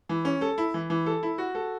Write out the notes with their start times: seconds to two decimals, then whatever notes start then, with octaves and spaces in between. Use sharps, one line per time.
0.09 E3
0.25 C#4
0.41 A4
0.58 E4
0.74 E3
0.90 E3
1.06 A4
1.23 E4
1.38 F#4
1.55 A4